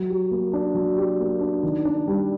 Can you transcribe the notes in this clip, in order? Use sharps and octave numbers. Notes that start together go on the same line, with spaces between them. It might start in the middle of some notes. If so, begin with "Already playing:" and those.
Already playing: F#3
G4
A#3
D4
F#3
G4
A#3
D4
D#3
D4
G3